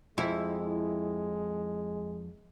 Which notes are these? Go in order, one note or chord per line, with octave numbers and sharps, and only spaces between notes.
F2 G#3 E4